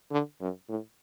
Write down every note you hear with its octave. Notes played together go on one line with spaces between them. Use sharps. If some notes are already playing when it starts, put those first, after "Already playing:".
D3
F#2
A2